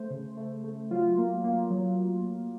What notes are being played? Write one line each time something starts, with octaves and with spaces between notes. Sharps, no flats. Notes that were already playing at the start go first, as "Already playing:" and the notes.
Already playing: A3 C5
C#3
A3
A3
F#3 F4
A#3
A#3
F#3